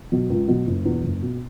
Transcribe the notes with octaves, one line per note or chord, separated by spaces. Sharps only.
B2 F#3
C#2
B2 F#3
F#1
E2 B2
F#1
B2